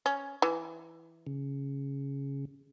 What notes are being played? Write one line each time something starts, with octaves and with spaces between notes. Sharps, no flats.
C#4
E3
C#3